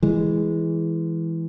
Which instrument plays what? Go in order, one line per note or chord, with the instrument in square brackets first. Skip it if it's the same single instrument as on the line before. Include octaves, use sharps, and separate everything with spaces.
[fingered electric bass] E3 G#3